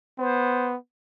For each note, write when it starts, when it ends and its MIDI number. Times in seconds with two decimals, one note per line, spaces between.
0.19 0.76 59
0.19 0.73 72